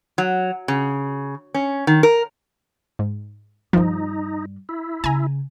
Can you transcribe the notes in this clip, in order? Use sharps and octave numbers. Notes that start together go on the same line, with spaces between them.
F#3
C#3
C#4
D#3
A#4
G#2
G2 D#3 F3 G3 D#4
E4
C#3 G#5 A#5